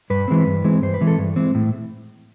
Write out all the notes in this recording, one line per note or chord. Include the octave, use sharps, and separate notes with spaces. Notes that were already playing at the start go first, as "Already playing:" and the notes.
G2 B4
E3 G#3 C4
G2
E3 G#3 C4
G2 C5
B4
E3 G#3 C4
A4
G2
E3 G#3 C4
A2